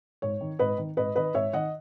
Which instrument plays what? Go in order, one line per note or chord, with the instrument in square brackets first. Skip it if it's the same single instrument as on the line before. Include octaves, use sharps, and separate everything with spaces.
[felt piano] G#2 C#5
D#3
G#2 B4 D#5
D#3
G#2 B4 D#5
D#3 B4 D#5
G#2 C#5 E5
D#3 D#5 F#5